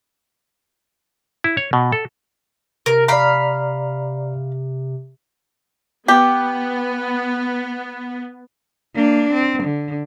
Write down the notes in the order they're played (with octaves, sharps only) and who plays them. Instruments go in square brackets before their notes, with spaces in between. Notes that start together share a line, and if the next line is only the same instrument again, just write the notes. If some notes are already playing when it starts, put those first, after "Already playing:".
[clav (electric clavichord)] E4
C#5
B2
A4
[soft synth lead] C3 [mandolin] A#4
[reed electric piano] D5 A#5 [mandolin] F5 B5
[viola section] B3 [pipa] G4
[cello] A#3 D4
C4
D3